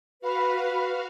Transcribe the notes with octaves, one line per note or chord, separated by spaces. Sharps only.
F#4 B4 F5